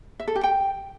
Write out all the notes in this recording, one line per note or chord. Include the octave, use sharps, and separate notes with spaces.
E5
A4
G4
G5